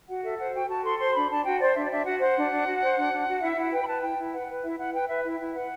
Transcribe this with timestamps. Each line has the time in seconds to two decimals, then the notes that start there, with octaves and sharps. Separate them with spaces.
0.09 F#4 F#5
0.24 A4 E5
0.39 C5 F#5
0.54 F#4 G5
0.69 F#4 A5
0.84 A4 C6
1.00 C5 C6
1.15 D4 B5
1.30 D4 A5
1.45 F#4 G5
1.60 C5 D5
1.75 D4 E5
1.84 D5
1.91 D4 E5
2.06 F#4 F#5
2.21 C5 F#5
2.36 D4
2.51 D4
2.66 F#4
2.81 C5
2.96 D4
3.12 D4
3.27 F#4
3.42 E4 E5
3.57 E4 F#5
3.73 B4 G5
3.83 B5
3.88 B4 A5
4.02 E4 G5
4.18 E4
4.33 B4 F#5
4.48 B4
4.63 E4 E5
4.79 E4 F#5
4.94 B4 G5
5.08 B4 E5
5.24 E4 E5
5.39 E4
5.54 B4 F#5